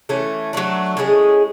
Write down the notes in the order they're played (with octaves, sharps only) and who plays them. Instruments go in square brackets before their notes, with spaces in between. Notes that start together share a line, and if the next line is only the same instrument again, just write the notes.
[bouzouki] E3 A3 C#4
F#3 A3 D4
A2 G#3 C#4 G#4